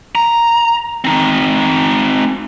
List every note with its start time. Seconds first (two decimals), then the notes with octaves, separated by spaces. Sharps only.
0.15 A#5
1.05 C4 D#4